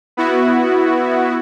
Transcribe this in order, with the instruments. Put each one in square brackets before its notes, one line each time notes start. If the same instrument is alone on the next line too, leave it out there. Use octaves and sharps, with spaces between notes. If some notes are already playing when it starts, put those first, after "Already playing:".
[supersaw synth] B3 E4 F#4